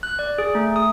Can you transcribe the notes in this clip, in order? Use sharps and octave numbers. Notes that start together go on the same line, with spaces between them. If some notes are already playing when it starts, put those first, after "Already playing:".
F#6
D5
G#4
A3
D#6